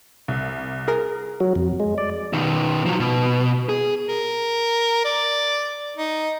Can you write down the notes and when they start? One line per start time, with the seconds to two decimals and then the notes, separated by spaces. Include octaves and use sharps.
0.28 C2
0.88 G#4 A#4 A#5
1.40 F#3
1.56 F2
1.80 G#3
1.98 D5
2.33 B2 D#3
2.85 F3 F#3
3.00 B2
3.69 G#4
4.08 A#4
5.05 D5
5.97 D#4